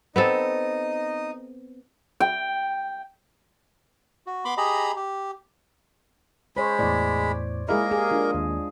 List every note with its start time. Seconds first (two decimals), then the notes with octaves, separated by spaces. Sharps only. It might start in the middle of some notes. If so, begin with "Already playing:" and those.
0.16 B3 C4 D#4 A4 D#5
2.20 G5
4.27 F#4
4.45 B3 B5 C6 D6
4.57 G4 G#4 D#5 A#5 B5
4.96 G4
6.57 G#3 C5 C#5 B5
6.79 E2 A2 D5
7.68 G#3 A#3 E4 G#4 A#4 D#5
7.91 G4 G#4
8.11 D4 F4
8.34 D#2